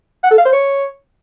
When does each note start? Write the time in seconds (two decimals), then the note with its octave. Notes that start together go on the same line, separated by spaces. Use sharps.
0.23 F#5
0.31 A4
0.38 F5
0.45 C5
0.53 C#5